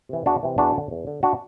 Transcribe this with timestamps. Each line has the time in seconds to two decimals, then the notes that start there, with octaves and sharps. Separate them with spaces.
0.09 C3 E3
0.26 E2 D4 F#4
0.43 C3 E3
0.58 E2 D4 F#4
0.75 D3
0.91 E2
1.07 D3
1.23 D4 F#4